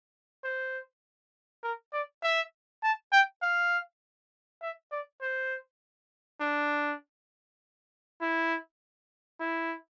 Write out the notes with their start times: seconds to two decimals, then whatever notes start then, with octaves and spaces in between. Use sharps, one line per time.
0.44 C5
1.63 A#4
1.92 D5
2.23 E5
2.83 A5
3.12 G5
3.42 F5
4.61 E5
4.92 D5
5.22 C5
6.40 D4
8.21 E4
9.40 E4